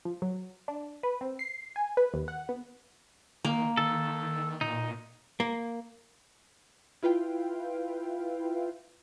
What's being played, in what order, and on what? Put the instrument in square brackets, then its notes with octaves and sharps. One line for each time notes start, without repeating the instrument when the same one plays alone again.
[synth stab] F3
F#3
D4
B4
C4
C7
G#5
B4
D#2
F#5
B3
[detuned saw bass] D#3 [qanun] A#3
[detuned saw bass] D#3 [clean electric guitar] A4
[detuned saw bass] A#2 [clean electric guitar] D#4
[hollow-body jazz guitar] A#3
[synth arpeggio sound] E4 F4 B4 F5 G5